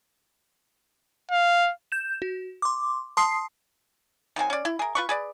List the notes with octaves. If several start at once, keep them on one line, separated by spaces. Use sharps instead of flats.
F5
G6 E7
F#4
C6 D6
A5 C6 D#6 C7
D#3 F#3 C4 G#5
C#4 D5
E4
G#4 A#4
F4 B4 C#6
G#4 B4 D5